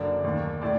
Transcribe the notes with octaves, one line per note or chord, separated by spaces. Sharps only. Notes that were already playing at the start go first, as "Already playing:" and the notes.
Already playing: F#1 F#2 D3 D5
D#2 D#3
A2 D5